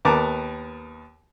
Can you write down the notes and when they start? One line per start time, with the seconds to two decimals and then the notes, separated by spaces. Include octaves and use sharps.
0.05 D#2 B3 A#4 A5 D6